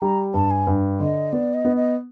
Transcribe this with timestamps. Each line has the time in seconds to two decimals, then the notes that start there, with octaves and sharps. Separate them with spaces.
0.02 G3 A#5
0.34 G2 A5
0.51 G#5
0.67 G2
1.00 D3 D#5
1.32 B3 D5
1.54 D#5
1.65 B3
1.76 D#5